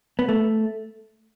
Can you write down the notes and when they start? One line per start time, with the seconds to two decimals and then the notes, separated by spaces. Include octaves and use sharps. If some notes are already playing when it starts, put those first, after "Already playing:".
0.19 B3
0.28 A3